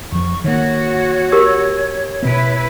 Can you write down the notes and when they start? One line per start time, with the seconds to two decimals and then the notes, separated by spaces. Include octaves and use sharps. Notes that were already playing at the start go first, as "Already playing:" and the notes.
0.12 F2 F3 C#6
0.44 D#3 A#3 F#4 C#5
1.32 G4 A#4 E6
2.22 B2 B3 E4 B4